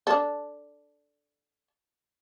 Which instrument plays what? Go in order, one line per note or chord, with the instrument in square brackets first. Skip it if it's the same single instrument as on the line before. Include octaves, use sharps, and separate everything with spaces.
[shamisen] D4 A4